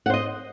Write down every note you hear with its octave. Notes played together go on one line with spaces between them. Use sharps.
C5 D#5 F#5